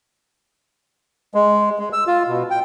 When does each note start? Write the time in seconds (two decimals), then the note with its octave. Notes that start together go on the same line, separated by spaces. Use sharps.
1.34 G#3
1.79 G#3
1.93 E6
2.07 F4
2.28 B2
2.51 G5